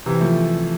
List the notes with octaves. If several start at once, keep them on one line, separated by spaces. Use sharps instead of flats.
C3 E3
F3 A3